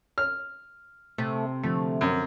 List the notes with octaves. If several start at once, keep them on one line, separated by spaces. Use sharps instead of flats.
F6
C3 A3
D3 F3 A3
F#2